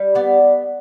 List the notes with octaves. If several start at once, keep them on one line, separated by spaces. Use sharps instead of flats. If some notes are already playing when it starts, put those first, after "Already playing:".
Already playing: G3
B3 D5